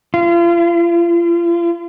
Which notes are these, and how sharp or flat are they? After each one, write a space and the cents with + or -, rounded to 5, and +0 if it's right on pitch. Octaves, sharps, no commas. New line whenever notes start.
F4 -40